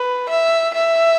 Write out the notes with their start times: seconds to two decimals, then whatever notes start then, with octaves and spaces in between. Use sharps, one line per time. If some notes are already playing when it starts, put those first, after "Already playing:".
Already playing: B4
0.29 E5
0.74 E5